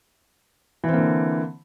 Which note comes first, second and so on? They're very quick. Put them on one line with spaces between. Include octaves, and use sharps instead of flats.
E3 C4 A#3 D3